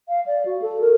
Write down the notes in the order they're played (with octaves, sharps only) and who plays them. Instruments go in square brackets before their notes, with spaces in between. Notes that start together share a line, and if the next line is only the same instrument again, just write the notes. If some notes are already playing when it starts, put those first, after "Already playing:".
[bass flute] F5
D5
F#4
A4
A#4